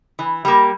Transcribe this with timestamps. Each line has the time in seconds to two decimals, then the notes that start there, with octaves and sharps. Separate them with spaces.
0.19 E3
0.45 G3 A#3